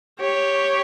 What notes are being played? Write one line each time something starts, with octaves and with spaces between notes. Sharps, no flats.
G4 C#5